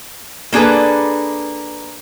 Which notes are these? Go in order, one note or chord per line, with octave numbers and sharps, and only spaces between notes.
A#3 D4 G#4 A4 B4